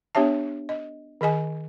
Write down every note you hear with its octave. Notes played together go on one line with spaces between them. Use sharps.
B3 D4 G4 C#5 E5 A5
D#5
D#3 G#4 D#5 G#5